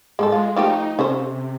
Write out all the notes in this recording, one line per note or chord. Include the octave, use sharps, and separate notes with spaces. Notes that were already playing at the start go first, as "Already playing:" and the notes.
G#2 G#3 D#4 A4
G#3 F4
F3 A3 D#4 G4
C3 C#4 A4 C5